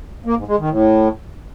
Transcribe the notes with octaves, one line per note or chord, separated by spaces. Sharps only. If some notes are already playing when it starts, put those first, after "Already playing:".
A#3
G#2
G#3
D#3
A2